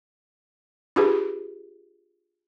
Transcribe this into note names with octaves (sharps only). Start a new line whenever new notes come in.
D4 F4 G4 G#4 B4